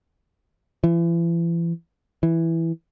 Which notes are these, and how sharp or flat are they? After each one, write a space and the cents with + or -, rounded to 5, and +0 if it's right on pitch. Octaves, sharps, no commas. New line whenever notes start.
E3 +35
E3 +0